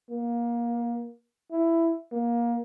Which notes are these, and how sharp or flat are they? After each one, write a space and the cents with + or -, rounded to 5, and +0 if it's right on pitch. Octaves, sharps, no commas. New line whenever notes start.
A#3 +25
E4 +10
A#3 +20